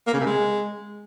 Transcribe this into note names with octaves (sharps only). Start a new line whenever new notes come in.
A#3
C#3
C3
G#3